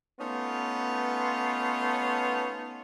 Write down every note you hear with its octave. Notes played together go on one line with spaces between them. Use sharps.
A3 B3 C#4 D#4 F4